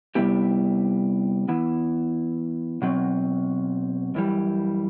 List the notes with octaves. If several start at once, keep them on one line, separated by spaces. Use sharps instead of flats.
C3 G3 B3 E4 G4
E3 B3 E4
B2 F#3 C4
F#2 E3 G3